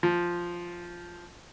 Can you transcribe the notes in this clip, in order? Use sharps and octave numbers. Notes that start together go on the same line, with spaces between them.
F3